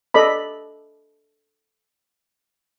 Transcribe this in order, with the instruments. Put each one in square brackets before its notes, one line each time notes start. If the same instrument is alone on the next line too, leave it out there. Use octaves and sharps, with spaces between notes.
[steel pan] A4 D5 D#5 B5